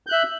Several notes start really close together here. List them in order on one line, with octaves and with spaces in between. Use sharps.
G6 F#6 E5